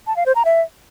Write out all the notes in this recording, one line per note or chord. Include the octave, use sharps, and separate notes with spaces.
A5
F5
C5
A#5
E5